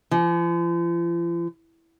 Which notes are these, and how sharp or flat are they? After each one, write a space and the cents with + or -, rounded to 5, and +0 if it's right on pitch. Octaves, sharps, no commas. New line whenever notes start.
F3 -45